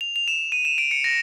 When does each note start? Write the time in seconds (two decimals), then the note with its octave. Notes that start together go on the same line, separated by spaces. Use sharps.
0.01 F7
0.16 F7
0.28 E7
0.52 D#7
0.65 E7
0.78 D7
0.91 C#7
1.04 A#6